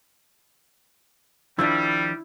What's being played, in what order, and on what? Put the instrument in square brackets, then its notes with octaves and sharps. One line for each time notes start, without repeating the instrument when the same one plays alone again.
[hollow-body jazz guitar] D#3 F3 D4 [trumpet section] G3 [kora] E4